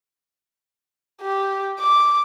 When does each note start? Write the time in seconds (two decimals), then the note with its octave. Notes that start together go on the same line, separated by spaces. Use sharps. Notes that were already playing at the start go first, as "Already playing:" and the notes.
1.22 G4
1.79 D6